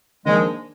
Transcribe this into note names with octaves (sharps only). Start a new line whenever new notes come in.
D#3 F3 G#3 A#3 D4 G#4